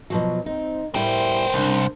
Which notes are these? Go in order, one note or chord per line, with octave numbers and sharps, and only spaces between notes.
B2 F3 F#3
C4 D#4
A2 G3 B3 E4 A#4 C5 G5
C2 F#2 D4